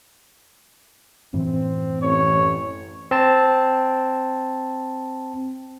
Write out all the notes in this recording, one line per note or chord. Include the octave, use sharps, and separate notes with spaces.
F#2 A2 E3 C4
A1 C#5
C4 A5